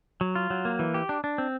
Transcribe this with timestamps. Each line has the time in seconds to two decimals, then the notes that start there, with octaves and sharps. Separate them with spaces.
0.21 F#3
0.35 F4
0.50 F#3
0.65 A#3
0.79 E3
0.94 G4
1.09 D4
1.24 D4
1.38 C4